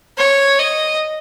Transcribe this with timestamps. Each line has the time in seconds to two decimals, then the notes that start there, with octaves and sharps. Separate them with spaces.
0.18 C#5
0.59 D#5